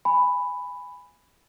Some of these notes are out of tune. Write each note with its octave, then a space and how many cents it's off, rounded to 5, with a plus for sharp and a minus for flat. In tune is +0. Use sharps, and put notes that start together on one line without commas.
G#5 -10 B5 +5